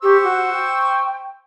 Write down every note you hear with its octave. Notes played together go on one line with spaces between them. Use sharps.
G4 C5 C#6 E6
F#4
G5